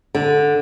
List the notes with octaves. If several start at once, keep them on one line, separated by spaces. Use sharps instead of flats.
D3